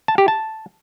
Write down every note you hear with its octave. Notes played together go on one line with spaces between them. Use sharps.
A5
G4
A5